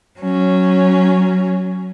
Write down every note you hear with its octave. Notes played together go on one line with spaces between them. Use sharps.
F#3 C#4